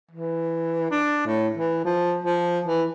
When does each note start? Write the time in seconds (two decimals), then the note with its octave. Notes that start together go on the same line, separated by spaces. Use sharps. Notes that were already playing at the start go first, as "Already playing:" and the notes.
0.11 E3
0.91 D4
1.26 A2
1.58 E3
1.85 F3
2.24 F3
2.65 E3